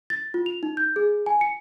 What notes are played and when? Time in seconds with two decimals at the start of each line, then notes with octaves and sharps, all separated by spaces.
0.10 A6
0.34 F4
0.46 F7
0.63 D#4
0.77 G6
0.96 G#4
1.26 G#5
1.41 C#7